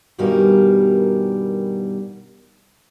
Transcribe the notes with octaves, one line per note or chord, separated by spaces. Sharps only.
G2 B2 D#3 G3 A#4 G#5